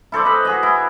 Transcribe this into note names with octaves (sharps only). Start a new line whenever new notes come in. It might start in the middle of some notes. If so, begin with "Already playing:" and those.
E4 A4 C5 D5
B4 D#5 B5
F#4 G#4 D#5
E4